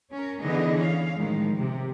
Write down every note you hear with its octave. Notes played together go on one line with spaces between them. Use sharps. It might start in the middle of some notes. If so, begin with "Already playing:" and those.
C#4 A#4
D3 E3 B3 D#4 G#4 D#5
C#4 F5
A2 D#3 F3 G#3
C3